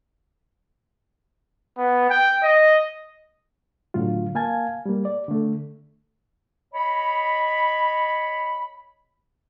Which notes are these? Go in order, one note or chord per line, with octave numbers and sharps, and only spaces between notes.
B3
G5
D#5
A2 D3 F#3 F4
A#3 F5 G#5 A5 G#6
G3 A#3
D5
D3 A3
C#5 D#5 B5